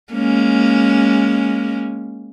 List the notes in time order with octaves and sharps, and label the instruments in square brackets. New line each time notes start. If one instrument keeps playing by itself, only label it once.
[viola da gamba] G#3 A#3 C#4